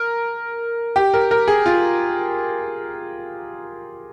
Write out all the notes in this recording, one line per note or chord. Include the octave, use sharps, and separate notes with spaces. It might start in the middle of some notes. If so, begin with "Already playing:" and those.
Already playing: A#4
G4
A#4
A#4
G#4
F4